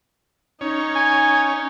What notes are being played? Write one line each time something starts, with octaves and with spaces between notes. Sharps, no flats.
C#4 D#4 C#5
G#5